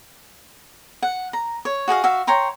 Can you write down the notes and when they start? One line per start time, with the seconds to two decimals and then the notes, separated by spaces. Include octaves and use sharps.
1.02 F#5
1.33 A#5
1.65 C#5
1.88 F#4 G#4 D#5 F5
2.04 F#4 E5 F5
2.27 C#5 G5 A#5 C6